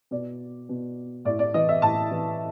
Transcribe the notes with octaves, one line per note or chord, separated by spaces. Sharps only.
B2 D5
B2
A2 D5
D5
E3 D#5
E5
A2 A5
E3